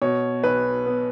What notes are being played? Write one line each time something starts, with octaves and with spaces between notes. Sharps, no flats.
B2 C#5
B1 B4
B3